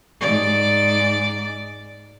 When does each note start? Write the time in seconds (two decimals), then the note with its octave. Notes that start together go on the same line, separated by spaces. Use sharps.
0.20 G#2 D5